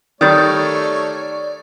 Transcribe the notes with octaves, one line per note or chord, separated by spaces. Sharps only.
D#3 G3 A3 C#5 D5 D#6 G6 A6